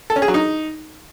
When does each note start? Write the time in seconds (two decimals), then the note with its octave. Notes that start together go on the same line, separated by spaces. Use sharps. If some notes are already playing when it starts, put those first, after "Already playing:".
0.10 A4
0.16 C#4
0.22 G#4
0.28 F#3
0.34 D#4